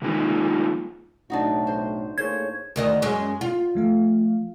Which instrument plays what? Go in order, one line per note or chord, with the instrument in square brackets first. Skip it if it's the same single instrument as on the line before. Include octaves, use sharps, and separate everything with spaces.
[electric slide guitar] D#3 F3 G#3 A#3 D#4 F4
[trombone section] B1 A2 [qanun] D4 D#4 F#4
[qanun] C5
[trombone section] A2 A#3 G#4 [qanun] C5 [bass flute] C#5 [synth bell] G#6
[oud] D2 D#3 D#5
F#2 G#3 C#4
F4
[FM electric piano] F3 A3 F5